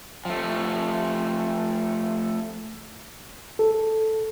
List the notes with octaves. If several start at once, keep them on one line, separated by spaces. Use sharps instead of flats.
F3 A3
A4